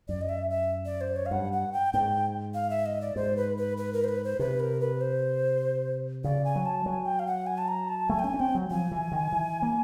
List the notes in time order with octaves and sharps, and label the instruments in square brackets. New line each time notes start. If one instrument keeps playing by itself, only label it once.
[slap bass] F#2 [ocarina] D5
[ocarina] D#5
E5
E5
D5
C5
C#5
F5
[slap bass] G2 [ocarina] F#5
[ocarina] F#5
G5
[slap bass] G#2 [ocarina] G5
[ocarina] F5
E5
D#5
D5
[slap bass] G#2 [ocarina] C5
[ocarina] B4
B4
B4
A#4
C5
B4
C5
[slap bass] C3 [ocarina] B4
[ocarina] A#4
B4
C5
[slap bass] C#3 [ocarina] D5
[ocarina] G#5
[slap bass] F#3
[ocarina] A5
[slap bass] F#3 [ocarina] G#5
[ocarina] G5
F5
F#5
G#5
A5
A#5
A5
[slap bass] A3 [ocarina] G#5
[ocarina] G5
[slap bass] C#4 [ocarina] G#5
[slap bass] C#4
[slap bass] C4 [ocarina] G5
[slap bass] F#3
[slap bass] F3 [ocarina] G#5
[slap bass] E3
D#3
E3
A#3